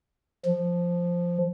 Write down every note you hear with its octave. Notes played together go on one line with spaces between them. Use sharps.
F3